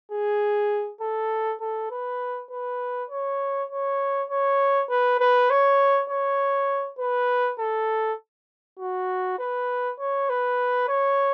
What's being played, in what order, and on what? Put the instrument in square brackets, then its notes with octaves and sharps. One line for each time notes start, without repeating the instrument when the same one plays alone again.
[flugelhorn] G#4
A4
A4
B4
B4
C#5
C#5
C#5
B4
B4
C#5
C#5
B4
A4
F#4
B4
C#5
B4
C#5